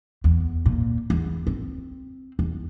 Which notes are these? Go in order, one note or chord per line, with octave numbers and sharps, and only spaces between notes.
E2
A#2
E2
C4
E2